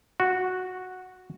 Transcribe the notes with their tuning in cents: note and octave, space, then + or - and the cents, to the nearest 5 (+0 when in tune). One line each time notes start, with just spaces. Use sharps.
F#4 -5